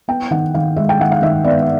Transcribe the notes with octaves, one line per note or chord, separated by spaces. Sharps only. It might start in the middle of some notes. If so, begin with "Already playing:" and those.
B3 G5
D#3 F#5
D#3 F5
G#3 E5
G5
D#3 F#5
F5
D#3 E5
B3 D5